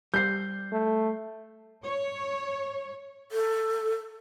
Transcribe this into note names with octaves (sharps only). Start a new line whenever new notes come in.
G3 C5 G6 C7
A3
C#5
A4